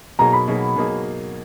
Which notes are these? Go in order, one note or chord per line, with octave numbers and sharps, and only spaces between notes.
B2 F#3 A#3 D#4 G#4 A#5
B5
B2 F#3 A#3 D#4 G#4
B2 F#3 A#3 D#4 G#4